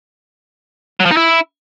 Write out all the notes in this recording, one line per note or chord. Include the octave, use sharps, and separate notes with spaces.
F#3
F3
D#4
E4